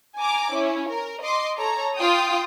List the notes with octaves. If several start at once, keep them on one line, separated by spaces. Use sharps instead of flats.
G#5 A#5 D6
C#4 E4
A#4
D#5 C6 D6
A4 C#5 A#5
F4 G5 D#6